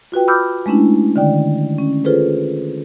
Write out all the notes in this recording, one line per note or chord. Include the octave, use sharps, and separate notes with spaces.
F4 F#4 B4 G5
B5 D6 E6 F6 G6
G#3 A3 C#4 D4 E4
D3 D#3 D5 G5
C#4
F4 G#4 A4 B4 C5